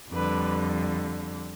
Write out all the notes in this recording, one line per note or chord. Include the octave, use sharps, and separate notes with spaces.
F2 D3 G3 B4